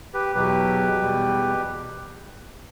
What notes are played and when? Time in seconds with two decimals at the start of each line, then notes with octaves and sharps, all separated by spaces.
0.14 G4 B4
0.35 E2 B2 F#3 G4 B4
1.01 E2 B2 G3